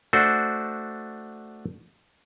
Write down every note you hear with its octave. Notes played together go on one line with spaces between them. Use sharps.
A3 D4 F#4 C5